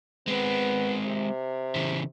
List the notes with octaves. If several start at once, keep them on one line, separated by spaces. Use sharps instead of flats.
G#3 B3 C4
C3
C#3 E3